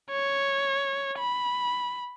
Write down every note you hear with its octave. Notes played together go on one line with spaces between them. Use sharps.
C#5
B5